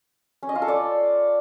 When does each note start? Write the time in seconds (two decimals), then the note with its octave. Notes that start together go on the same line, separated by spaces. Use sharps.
0.43 C#4
0.49 D#5
0.55 F4
0.62 A4
0.68 D5